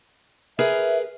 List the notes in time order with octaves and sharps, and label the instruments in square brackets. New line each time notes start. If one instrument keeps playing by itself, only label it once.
[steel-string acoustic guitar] G#4 A#4 B4 [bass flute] E5